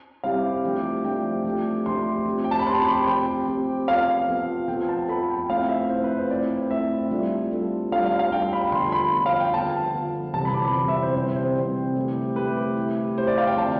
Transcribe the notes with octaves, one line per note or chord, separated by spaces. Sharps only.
G3 C4 E4 G4 F5
F3 A3 D4 G4
F3 A3 D4 G4 G5
F3 A3 D4 G4
F3 A3 D4 G4 C6
F3 C4 G4
G5
A5
B5
F3 C4 G4 C6
B5
F3 C4 G4 G5
F3 C4 G4
F3 B3 F4 A4 F5
F3 B3 F4 A4
F3 B3 F4 A4 G5
A5
F3 B3 F4 A4 B5
G5
A3 C4 E4 F5
E5
A3 C4 E4 C5
B4
C5
A3 C4 E4 D5
A3 C4 E4 E5
G3 D4 F4 A4
G3 D4 F4 A4
G3 D4 F4 A4 F5
F5
F5
G3 D4 F4 A4 G5
B5
D3 F3 B3 C6
B5
D3 F3 B3
F5
G5
D3 F3 B3 A5
D3 F3 B3
C3 E3 G3 C4 A5
B5
D6
B5
C3 E3 G3 C4
E5
C5
C3 E3 G3 C4 C5
C5
C3 E3 G3 C4
A3 E4 G4
A3 E4 G4 B4
A3 E4 G4
A3 E4 G4 C5
D5
F5
G5
D3 F3 C4 A5